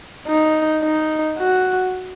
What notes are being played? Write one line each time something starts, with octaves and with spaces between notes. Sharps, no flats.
D#4
D#4
F#4